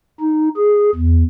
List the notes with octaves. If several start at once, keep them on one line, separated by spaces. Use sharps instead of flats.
D#4
G#4
E2